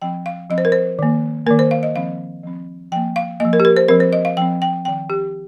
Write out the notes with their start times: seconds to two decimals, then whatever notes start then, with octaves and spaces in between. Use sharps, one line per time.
0.02 F3 C4 G5
0.26 F5
0.50 F3 C4 D#5
0.58 C5
0.65 A#4
0.72 C5
0.99 D#3 A#3
1.46 D#3 A#3 A#4
1.59 C5
1.71 F5
1.83 D#5
1.95 F3 C4 F5
2.43 F3 C4
2.92 F3 A#3 G5
3.16 F5
3.40 F3 A#3 D#5
3.53 A#4
3.60 G4
3.65 A#4
3.77 C5
3.88 F3 C4 A#4
4.00 C5
4.13 D#5
4.25 F5
4.37 F3 C4 G5
4.62 G5
4.85 D#3 C4 G5
5.10 G4